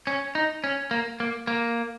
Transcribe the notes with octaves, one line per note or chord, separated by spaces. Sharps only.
C#4
D#4
C#4
A#3
A#3
A#3